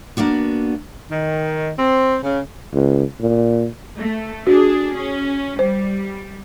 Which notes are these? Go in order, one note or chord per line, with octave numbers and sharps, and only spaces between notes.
A#3 B3 D4 F#4
D#3
C4
C#3
C#2
A#2
A3
D4 F#4 G#4
C#4
G3 C5